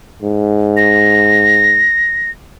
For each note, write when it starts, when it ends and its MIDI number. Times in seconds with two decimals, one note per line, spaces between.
0.22 1.90 44
0.77 2.31 94